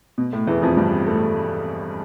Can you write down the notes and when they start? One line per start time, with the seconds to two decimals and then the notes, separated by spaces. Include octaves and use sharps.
0.18 B2
0.33 A2
0.47 E2 E3
0.62 F2 F3
0.77 G2 G3
1.07 A2 A3